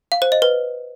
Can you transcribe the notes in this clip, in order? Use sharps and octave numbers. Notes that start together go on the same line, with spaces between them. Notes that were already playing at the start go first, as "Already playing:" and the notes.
F5
C5
D#5
B4